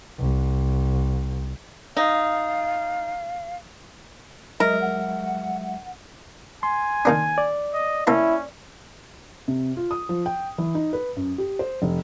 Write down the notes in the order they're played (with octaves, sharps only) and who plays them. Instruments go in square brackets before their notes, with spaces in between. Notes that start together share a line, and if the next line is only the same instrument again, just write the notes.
[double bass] C2
[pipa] D#4 [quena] F5
[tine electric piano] F#3 G#3 E5 [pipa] A#4 [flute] D#5
[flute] F#5
[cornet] G#5 [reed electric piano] C6
[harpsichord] D#3 A#3 D4
[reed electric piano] D5
[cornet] D#5
[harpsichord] A#3 E5 A5 [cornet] C#4 [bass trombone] E4
[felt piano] C3
F4
D#6
F3
G5
E3
D#4
B4
F#2
G4
C5
F1